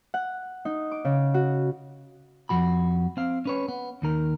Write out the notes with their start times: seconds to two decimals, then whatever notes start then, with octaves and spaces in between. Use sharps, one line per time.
0.14 F#5
0.65 D#4
0.91 D6
1.05 C#3
1.34 F#4
2.49 F2 G#2 F3 F#4 B5
3.17 C4 F5
3.45 C#4 B4 C#5
3.68 B3
4.02 D#2 D#3 A#4